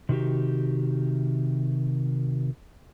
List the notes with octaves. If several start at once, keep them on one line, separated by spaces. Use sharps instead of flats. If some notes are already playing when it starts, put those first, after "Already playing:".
C3 D#3 F#4 G4